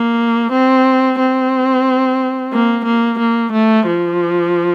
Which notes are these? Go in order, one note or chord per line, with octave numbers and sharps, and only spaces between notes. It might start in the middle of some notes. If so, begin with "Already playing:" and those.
Already playing: A#3
C4
C4
A#3
A#3
A#3
A3
F3